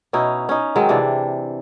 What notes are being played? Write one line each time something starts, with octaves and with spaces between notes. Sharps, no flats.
B2 C#4 D#4 E4
C#4 D#4
D#3 F#3 G#3 C4
C3 E3 D4